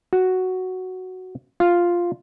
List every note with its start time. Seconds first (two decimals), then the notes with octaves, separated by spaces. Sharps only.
0.13 F#4
1.60 F4